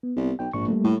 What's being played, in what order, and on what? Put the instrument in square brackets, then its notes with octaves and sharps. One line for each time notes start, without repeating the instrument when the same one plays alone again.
[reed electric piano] B3
[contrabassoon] C2
[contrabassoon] B1 [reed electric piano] G5
[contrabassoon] A#1 [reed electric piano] G#2 C#6
[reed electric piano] G3 A3 A#3
[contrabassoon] A2